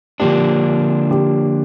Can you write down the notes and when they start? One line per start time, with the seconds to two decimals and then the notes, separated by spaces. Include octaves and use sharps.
0.20 D3 F3 A#3 D4 G4
1.11 G4